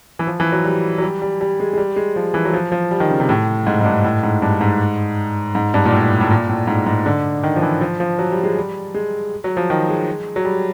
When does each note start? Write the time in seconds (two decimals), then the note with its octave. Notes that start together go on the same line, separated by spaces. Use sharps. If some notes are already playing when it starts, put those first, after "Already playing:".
0.19 E3
0.27 F3
0.40 E3
0.52 F#3
0.64 G3
0.98 F#3
1.02 G3
1.22 G3
1.41 G3
1.60 G#3
1.73 G#3
1.78 G3
1.96 G#3
2.16 F3
2.34 E3
2.45 F#3
2.53 F3
2.72 F3
2.91 G3
3.00 D#3
3.10 C#3
3.20 C3
3.29 A2
3.66 G#2
3.81 G#2
3.85 G2
4.04 A2
4.23 G#2
4.42 G2
4.61 G#2
5.55 G#2
5.74 G2
5.85 A#2
5.92 A2
6.21 A2
6.30 A#2
6.49 A2
6.67 G#2
6.86 G#2
7.06 D3
7.43 D#3
7.56 F3
7.62 E3
7.81 F3
8.00 F3
8.19 F#3
8.32 G3
8.44 G#3
8.57 G3
8.94 G#3
9.44 F#3
9.57 F3
9.70 D#3
9.89 G#3
10.36 F#3
10.45 G3